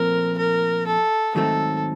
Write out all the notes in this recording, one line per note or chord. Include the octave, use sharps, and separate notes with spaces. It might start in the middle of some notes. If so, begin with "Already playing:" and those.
Already playing: A#2 F3 A3 C4 A#4
A#4
A4
G#2 D#3 F#3 A3 C4 A4